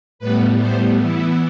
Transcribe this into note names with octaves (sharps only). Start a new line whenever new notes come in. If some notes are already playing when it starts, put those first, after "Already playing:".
A2 G3 B3 B4
C5
E3 B3 E4